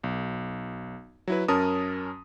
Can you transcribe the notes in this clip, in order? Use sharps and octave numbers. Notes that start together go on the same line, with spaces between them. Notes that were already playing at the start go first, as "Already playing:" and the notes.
B1
F#3 E4 B4
F#2 C#4 A#4 A5 D#6